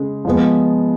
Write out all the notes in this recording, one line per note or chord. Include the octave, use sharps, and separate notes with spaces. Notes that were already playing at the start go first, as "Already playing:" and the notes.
Already playing: C#3 G#3 C#4
F3 G#3 B3